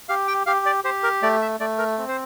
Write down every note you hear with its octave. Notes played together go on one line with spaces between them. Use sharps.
G4 F5
G5
G4 F5
D5
G4 C5
A#4
A3 D5
E5
A3 D5
A#4
C4
C5